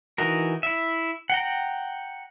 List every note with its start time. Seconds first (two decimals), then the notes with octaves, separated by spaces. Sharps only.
0.18 E3 D#4 F#4 A#4
0.63 E4 E5
1.30 F#5 G5 A#5